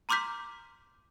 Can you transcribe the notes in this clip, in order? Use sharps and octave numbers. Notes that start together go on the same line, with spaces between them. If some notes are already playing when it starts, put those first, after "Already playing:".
A#5 C6 D6 F6 G6 B6